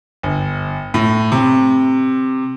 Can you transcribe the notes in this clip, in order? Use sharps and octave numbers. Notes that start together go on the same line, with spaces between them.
G1
A2
C3